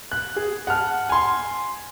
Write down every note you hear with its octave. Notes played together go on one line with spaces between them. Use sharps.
F#6
G#4
F#5 A5 F6
G#5 C6